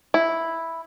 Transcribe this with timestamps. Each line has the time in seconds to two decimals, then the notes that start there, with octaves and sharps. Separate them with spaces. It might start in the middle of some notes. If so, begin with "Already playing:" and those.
0.14 E4